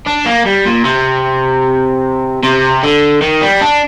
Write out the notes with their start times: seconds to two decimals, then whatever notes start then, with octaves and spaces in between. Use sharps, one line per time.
0.07 D4
0.26 A#3
0.46 G3
0.66 A#2
0.85 C3
2.43 C3
2.83 D3
3.22 D#3
3.42 G3
3.62 D4